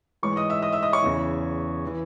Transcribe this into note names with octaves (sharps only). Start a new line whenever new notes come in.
G#2 E3 C#5 C#6
D#5 D#6
E5 E6
D#5 D#6
E5 E6
D#5 D#6
C#5 C#6
E2 C#3 E3
E3